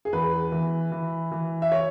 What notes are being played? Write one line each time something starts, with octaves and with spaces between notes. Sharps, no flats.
G#4
E2 B4
E3
E3
E3
E5
C#5